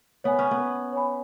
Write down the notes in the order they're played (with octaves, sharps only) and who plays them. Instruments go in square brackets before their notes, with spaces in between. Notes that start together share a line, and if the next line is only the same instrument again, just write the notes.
[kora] B3 [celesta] C#5 G#5 B5
[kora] C#4
B3
[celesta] C#5 G#5 B5